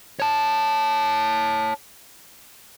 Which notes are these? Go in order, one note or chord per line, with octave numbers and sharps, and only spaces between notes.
C#5 A5